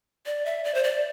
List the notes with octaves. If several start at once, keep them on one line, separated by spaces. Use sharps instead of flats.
D5
E5
D5
C5
D5